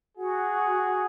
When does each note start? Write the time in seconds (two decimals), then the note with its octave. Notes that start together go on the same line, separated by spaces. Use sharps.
0.17 F#4 G#4 F#5